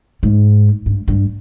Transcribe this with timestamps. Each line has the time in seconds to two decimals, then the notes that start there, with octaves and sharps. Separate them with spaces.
0.23 G#2
0.86 G2
1.08 G2